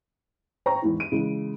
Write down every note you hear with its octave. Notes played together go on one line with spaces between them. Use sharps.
C5 C#5 G5 A#5 C#6
E2 G#2 E3
D7 D#7
C#3 E3 G#3